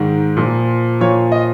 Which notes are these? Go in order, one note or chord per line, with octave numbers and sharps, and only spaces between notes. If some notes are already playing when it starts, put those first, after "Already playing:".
Already playing: G#2 D#3
A#2 F3
A#2 F3 C#5
D#5